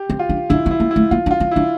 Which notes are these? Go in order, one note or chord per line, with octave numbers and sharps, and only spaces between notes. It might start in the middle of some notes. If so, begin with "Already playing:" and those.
Already playing: G4
C4
F4
D4
D4 E4
C4
E4
A#3
E4
A3
A#3 F4
D4
F4
C4
D4 E4